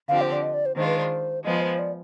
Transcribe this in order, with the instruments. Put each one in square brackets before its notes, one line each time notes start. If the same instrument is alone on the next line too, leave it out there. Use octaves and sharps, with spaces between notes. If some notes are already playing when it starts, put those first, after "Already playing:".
[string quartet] D3 F3 C4 G4 [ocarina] F5
[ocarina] C5
D5
D#5
D5
C5
[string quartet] D#3 G#3 D4 F4 [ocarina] C5
[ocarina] B4
C5
[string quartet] F3 G#3 B3 [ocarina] D#5
[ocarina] C5
D5